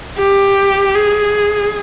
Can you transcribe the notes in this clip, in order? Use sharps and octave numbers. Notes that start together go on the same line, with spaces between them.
G4
G#4